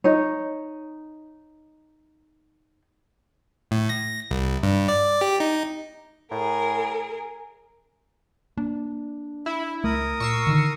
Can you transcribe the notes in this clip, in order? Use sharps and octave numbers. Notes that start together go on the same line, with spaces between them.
D#4 C#5
A2
A#6
C2
G2
D5
G4
D#4
A2 G#4 A#4
A#3 D4
E4 E5
C#2 A3 A#4 D#6
A#2 C#6 E6 C7
D3 D#3